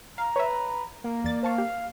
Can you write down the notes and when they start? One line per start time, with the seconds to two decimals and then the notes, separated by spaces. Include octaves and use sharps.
0.18 F5 A#5
0.36 B4 C#5 E5
1.04 A#3 A#4
1.24 E2 D5 A6
1.43 C5 F5 A5 C#6
1.58 G4